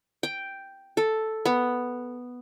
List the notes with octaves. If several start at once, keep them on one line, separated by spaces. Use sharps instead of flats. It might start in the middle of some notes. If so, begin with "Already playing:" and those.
G5
A4
B3